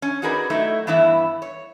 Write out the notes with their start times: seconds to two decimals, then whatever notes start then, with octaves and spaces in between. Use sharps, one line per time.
0.02 C#4
0.22 D#4 F#4 G#4 A#4 B4 D5
0.50 F#3 A3 D#4 E4
0.87 G2 E3 B3 E4 E5
1.42 C#5